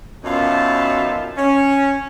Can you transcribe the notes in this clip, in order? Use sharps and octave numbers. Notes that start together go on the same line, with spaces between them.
F#2 B2 D#4 F4 E5 A5
C#4